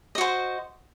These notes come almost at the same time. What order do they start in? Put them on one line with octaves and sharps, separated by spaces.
D#5 F#4 C5